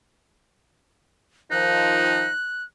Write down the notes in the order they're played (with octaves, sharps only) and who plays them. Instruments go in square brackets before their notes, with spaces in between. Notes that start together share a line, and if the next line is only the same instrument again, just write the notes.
[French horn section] D#3 F3 [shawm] D#4 [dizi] F#6